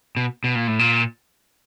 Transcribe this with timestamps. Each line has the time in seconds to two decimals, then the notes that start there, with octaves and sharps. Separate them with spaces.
0.17 B2
0.44 B2
0.55 A#2
0.67 A2
0.79 A#2